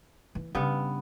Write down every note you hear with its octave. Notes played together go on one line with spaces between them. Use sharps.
E3
G2 C#3 B3 C#4